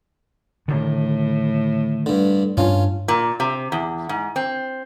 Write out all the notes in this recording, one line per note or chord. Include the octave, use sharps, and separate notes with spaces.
A2 D3 D#3
G2 D3
G2 C#4 D4 F4
A#2
C3
E2
G#2
C4